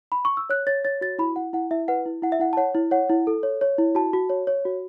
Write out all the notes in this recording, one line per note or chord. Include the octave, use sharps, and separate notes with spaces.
B5
C#6
E6
C#5 F#6
C#5 A6
C#5 A6
F#4 A6
E4 B5
E4 F#5
E4 F#5
E4 E5
B4 F#5
E4
E4 F#5
E5
E4 F#5
A5
C#5 F#5
E4
C#5 F#5
E4
A4
C#5
C#5
E4
F#4 A5
F#4
C#5
C#5
F#4